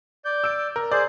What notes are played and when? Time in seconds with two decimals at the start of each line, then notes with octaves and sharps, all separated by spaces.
0.25 D5 G6
0.44 E6 D7
0.76 A#4
0.92 G#4 C5 D5